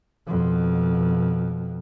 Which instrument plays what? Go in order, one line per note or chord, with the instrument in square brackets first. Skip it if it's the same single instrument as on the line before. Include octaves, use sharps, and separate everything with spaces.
[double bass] F2 B2